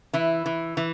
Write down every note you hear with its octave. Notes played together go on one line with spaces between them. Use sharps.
E3 E4
E3
E3